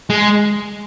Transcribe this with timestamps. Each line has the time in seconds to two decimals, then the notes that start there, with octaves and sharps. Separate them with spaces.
0.10 G#3